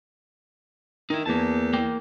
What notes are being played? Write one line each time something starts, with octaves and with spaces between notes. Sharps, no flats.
D#3 D#4 E4
E2 A#3 A5
A#3 G5